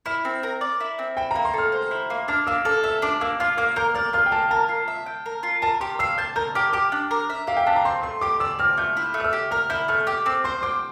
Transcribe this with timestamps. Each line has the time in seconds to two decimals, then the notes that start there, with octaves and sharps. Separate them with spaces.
0.06 E4 F6
0.25 C4
0.43 A#4
0.61 D5
0.80 E4
0.99 C4
1.17 E4 G5
1.31 A#5
1.35 A#3
1.45 C6
1.53 A4 F6
1.72 C5
1.91 E4
2.10 A#3
2.28 D4 F6
2.47 A#3 E6
2.65 A4 F6
2.83 E5 E6
3.02 D4 D6
3.21 A#3 E6
3.40 F4 F6
3.57 A#3 F6
3.76 A#4 G6
3.95 D5 F6
4.13 F4 F6
4.26 G5
4.32 A#3 A5
4.51 A#4 A5
4.69 F4
4.88 E5
5.06 G5
5.26 A#4
5.43 F4
5.62 A#4 A5
5.81 G4 C6
5.99 F5 E6
6.18 A5 G6
6.36 A#4 G6
6.55 G4 F6
6.73 G4 D6
6.92 D4
7.11 A#4
7.30 E5
7.47 G4 F5
7.57 G5
7.66 D4 A5
7.76 A#5
7.85 C4 C6
8.03 A3 C6
8.21 G4 D6
8.40 D5 E6
8.59 C4 F6
8.77 A3 G6
8.97 E4
9.14 A3
9.20 F6
9.24 E6
9.33 G4
9.51 A#4 F6
9.70 E4 G6
9.88 A3 F6
10.07 G4 F6
10.26 C4 D6
10.44 C5 C6
10.63 G5 D6